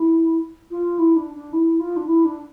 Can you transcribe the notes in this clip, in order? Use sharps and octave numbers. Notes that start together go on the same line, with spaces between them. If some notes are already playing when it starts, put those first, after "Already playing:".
Already playing: E4
F4
E4
D4
D4
E4
F4
D4
E4
D4